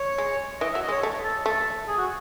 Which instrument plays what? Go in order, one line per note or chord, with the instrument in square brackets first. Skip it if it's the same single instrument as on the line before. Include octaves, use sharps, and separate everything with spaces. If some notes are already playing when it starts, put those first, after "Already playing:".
Already playing: [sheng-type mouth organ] C#5
[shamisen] G#3
[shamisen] E3 [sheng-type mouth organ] D#5
[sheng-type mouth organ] E5
[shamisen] F#3
[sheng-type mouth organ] D#5
[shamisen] G#3
[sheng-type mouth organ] C#5
[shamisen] A3
[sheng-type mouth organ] A4
[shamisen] A3
[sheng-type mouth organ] G#4
F#4